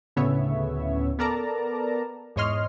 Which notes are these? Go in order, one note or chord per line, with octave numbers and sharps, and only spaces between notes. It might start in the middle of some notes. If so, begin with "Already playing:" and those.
D2 A2 C#3 B3 C#5 E5
B3 A4 A#4 D5 A5 A#5
E2 G#2 C#5 D#5 C6 F6